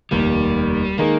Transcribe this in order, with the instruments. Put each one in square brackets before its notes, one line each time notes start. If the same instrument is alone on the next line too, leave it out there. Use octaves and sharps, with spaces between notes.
[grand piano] F1 D#2 D#3 A#3 [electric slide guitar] G3
[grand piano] D#3 G#3 D#4 [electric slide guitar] A#3